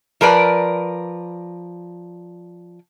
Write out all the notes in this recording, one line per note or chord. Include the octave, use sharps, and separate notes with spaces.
F3 A#4 B4 D5